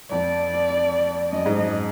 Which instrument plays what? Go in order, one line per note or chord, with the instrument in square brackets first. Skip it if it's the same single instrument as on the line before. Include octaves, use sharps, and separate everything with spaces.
[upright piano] F2 [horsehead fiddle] D5
[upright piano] F#2 [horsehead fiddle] D#5
[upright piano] G#2
F#2